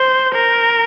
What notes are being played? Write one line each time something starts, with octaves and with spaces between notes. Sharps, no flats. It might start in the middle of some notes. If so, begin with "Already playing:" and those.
Already playing: C5
A#4